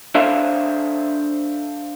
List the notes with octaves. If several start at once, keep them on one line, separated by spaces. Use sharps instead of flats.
D4 A4 C5 E5 F5